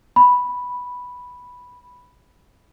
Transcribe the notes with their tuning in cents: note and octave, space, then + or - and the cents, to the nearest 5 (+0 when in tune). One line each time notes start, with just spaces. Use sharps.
B5 -5